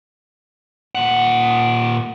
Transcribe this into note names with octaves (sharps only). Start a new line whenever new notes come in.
A#2 F#5